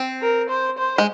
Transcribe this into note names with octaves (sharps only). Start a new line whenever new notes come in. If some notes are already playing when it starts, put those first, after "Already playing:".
Already playing: C4
A#4
C5
C5
G#3